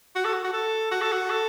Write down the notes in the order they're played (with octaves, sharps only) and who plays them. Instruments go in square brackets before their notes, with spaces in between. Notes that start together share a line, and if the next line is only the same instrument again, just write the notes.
[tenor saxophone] F#4
A4
F#4
F#4
A4
F#4
A4
F#4
A4